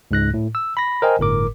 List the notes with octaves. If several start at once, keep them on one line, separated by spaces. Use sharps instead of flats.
C#2 G#2 F#6 A#6
A2
E6
B5 A#6
A#4 C5 D#5 G5 G#5
G1 A2 A#4 D6